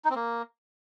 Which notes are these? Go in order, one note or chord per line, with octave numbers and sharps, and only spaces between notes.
D#4
C4
A#3